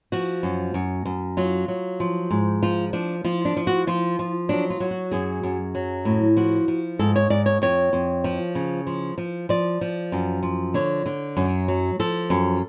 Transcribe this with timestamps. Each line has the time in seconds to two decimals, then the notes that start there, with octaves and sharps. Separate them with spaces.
0.12 F3 F#4
0.43 F#2
0.74 F#2
1.05 F#2
1.37 F#3 F4
1.68 F#3
2.00 F3
2.31 G#2
2.63 F3 F4
2.93 F3 D4
3.24 F3 F4
3.45 D4
3.57 F3
3.67 F#4
3.87 F3 F4
4.19 F3
4.49 F#3 D4
4.70 F4
4.80 F#3
4.91 F#4
5.12 F#2 G#4
5.43 F#2
5.75 F#3
6.05 A2
6.37 F3 F#4
6.68 F3
6.99 G#2 A4
7.16 C#5
7.30 G#2 D5
7.46 C#5
7.62 F2 C#5
7.93 F2
8.24 F3
8.55 C#3
8.87 F3
9.18 F3
9.49 F3 D5
9.81 F3
10.12 F#2
10.43 F3
10.74 D3 C#5
11.06 D3
11.37 F#2
11.68 F#3
11.99 F3 A4
12.30 F#2